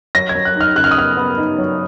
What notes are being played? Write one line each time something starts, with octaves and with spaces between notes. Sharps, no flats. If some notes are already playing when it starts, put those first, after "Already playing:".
F#3 A#6
G#6
F#3
F#6
D#4 F6
C#3 F#6
F6
D#6
B3 F6
B3
D#4
F#3